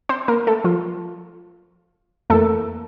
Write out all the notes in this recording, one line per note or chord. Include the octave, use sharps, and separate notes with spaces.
C4 C5
A#3 A#4
A3 A4
F3 F4
F2 E3 A3 A#3 A4